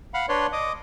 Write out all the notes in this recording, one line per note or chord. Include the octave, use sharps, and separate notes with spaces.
F5 F#5 B5
D4 B4 C#5 D5 C6
D#5 D6 D#6